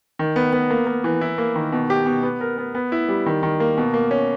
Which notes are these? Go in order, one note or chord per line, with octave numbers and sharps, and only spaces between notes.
D#3
B3
B3
A#3
A#3
E3
E4
A#3
D#3
B2
G4
B2
B3
A#4
B3
B3
E4
G3
D#3
D#3
A#3
B2
A#3
C#4